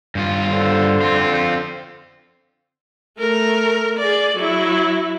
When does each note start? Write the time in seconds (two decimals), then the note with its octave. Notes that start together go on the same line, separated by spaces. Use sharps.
0.15 G2 F4
0.50 D3 C5
1.01 C4 F4
3.19 A3 A#4
3.99 G#4 D5
4.37 F#3 E4